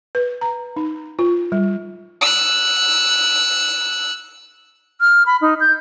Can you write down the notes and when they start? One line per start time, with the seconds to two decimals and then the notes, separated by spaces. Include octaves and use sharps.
0.15 B4
0.41 A#5
0.76 D#4
1.19 F4
1.52 G3
2.21 E6 F#6
5.01 F6
5.26 B5
5.41 D#4
5.60 G6